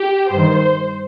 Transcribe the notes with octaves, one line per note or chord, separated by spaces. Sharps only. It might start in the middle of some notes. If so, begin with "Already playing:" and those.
Already playing: G4
G2 D#3 C5